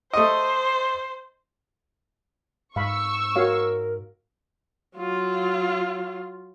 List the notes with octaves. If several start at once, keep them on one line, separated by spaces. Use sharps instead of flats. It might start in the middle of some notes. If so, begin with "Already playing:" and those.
A3 C5 D#5
G#2 F5 B5 C#6 E6
F#4 A#4 C#5 F5
F#3 F4